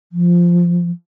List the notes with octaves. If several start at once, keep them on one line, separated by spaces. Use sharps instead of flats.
F3